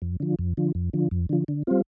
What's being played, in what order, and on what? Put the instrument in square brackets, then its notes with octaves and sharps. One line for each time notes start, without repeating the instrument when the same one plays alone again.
[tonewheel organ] F2
D3 F3
F2
D3 F3
F2
D3 F3
F2
D3 F3
D3
G3 C4 F4